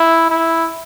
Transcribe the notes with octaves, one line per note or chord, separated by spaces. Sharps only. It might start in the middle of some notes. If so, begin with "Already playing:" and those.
Already playing: E4
E4